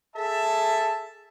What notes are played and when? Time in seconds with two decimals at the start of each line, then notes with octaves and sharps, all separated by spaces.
0.16 G#4 A4 E5 A5